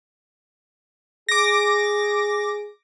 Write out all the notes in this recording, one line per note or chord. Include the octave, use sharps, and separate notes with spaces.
G#4 D6 A#6